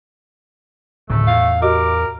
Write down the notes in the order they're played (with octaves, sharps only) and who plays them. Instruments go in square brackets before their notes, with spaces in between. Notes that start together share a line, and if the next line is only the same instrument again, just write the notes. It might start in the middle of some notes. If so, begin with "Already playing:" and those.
[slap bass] D1 C#3 [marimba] A2 [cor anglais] A3
[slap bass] E2 [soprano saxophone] F5
[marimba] F#4 G4 D#5 [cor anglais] A#4 [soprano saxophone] D6